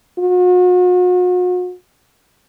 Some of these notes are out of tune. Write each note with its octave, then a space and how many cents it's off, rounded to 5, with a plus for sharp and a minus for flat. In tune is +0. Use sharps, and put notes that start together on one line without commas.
F#4 -40